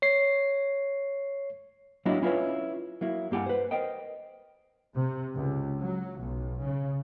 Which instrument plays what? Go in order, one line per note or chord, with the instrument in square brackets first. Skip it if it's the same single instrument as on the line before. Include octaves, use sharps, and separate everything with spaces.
[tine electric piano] C#5 C7
[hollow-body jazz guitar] F#3 A#3 D4 E4 F#4 D#5
C#4 E4 F4 G#4 B4 C#5
F#3 A#3 E4
G2 A#3 G4 F#5 G#5
B4 C5
A#4 C5 D#5 G5
[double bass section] C3
C#2
F#3
B1
C#3